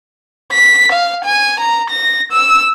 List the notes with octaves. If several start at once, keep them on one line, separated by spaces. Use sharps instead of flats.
B6
F5
G#5
A#5
A#6
E6